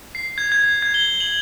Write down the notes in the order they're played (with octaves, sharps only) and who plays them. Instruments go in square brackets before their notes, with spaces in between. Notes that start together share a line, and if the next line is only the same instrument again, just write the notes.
[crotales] C7
G#6
G#6
G#6
G7
F#7